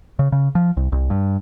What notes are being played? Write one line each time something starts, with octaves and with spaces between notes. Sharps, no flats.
C#3
C#3
F3
C2
C2
G2